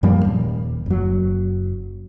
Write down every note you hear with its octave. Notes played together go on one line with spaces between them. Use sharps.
F#2 F3 G3 A#3
D#1
F#1 F#3